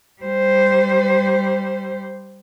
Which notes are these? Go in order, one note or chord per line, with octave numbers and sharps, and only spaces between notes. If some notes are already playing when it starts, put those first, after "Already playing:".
G3 C5